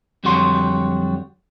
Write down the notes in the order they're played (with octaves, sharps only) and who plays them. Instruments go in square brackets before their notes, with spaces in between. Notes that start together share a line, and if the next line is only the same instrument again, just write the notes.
[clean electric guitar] F2 D3 F#3 G3 F#4 C6